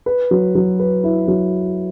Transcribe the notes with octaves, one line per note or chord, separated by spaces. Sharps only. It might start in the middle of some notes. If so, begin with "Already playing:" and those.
B4
F#3
F#3
B4
E4
F#3